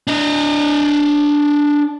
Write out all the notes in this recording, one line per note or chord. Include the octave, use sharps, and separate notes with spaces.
D4 D#5